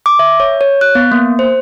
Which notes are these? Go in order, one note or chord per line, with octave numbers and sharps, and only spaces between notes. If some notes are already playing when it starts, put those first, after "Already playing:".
D6
E5
C#5
C#5
F#6
B3
A#3
C5